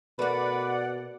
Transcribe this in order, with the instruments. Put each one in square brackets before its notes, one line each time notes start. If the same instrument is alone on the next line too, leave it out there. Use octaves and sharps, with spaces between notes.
[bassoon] B2 [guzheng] A3 A#3 [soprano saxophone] B4 [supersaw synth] D5 F#5